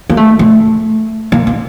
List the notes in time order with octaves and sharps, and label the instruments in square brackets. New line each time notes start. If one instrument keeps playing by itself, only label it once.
[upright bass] A#3
A3
A3
A#3
A#3